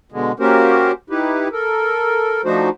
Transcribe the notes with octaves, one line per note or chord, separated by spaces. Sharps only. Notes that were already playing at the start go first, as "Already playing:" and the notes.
B2 D3 G#3
A#3 C#4 F#4 G4 A#4 C5
D#4 E4 G4 B4
A4 A#4
F3 A3 D4 D#4 F#4 C5